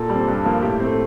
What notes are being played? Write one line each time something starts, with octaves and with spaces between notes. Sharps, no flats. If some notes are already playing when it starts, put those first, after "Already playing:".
Already playing: A#2 A4
G3 C4
G2
F3 A#3
A2 G4
A3 C4